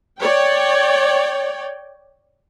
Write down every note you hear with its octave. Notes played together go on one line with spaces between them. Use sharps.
C#5 D5 G5